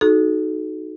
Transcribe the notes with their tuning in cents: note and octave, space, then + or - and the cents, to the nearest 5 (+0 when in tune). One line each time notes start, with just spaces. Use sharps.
D#4 +0 F#4 +0 A4 -25